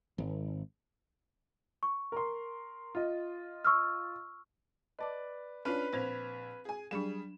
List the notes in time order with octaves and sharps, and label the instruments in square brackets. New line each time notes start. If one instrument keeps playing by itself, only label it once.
[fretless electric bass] G#1
[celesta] C#6
[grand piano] A#4 C6
F4 D#5
[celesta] C#6 E6 F6
[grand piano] B4 D5 [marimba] D#5 A5 D6
[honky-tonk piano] C#4 D4 F4 [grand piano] B4 [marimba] F6
[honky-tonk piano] A#1 G#6 F7 [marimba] C4 C5
[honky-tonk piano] G#4 G#5
[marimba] F#3 D4 [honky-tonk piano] G3 G#4 [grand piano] E7